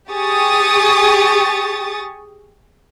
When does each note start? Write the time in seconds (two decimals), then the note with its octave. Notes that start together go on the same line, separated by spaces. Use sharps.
0.11 G4 G#4 C#6 D#6 A6